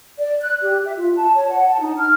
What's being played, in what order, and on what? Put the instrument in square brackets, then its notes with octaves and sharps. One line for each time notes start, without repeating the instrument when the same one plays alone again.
[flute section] D5
F#6
G4
E5
F4
A5
C#5
F#5
A5
D#4
F6